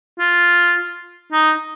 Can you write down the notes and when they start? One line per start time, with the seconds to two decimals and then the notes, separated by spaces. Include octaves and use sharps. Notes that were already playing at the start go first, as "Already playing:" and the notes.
0.19 F4
1.32 D#4